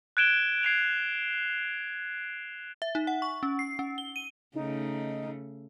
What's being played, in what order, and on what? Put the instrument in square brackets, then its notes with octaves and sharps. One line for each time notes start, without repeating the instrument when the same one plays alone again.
[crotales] F#6 G#6 D7 E7 G7
G#6 C7 D7 F7
[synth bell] E5
D#4
F#5
C#6
C#4
C7
C#4
G7
D#7
[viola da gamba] C#3 A3 [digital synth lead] D#4